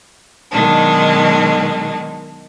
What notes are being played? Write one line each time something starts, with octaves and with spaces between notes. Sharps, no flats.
B2 D#3 F#3 G#3 D4 D#4